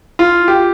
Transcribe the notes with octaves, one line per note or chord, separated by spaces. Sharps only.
F4
G4